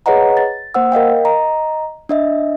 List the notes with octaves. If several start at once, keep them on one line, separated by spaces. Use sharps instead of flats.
G#4 B4 C#5 D#5 F#5 A#5
A6
A#3 C5 F#5 E6
A#4 D#5 F5 G5
D#5 A#5
D4 D#5 E5